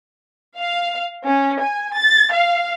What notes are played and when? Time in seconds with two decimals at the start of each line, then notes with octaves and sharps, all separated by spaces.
0.60 F5
1.24 C#4
1.61 G#5
1.95 A6
2.31 F5